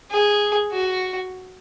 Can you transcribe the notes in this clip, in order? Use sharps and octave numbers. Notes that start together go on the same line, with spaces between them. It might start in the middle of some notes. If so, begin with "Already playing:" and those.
G#4
F#4